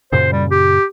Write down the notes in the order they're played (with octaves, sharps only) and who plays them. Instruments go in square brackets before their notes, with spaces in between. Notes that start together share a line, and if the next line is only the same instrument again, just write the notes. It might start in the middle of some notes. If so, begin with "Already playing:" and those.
[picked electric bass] F#2 A#2 C#3 [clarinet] C5
[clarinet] G3
G4